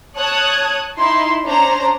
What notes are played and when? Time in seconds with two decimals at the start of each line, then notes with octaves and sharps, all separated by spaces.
0.16 C#5 A5 D#6 F#6 G#6
0.97 D#4 E4 C6
1.44 C#4 D4 C5 A#5